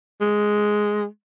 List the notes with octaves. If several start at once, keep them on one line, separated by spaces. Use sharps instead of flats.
G#3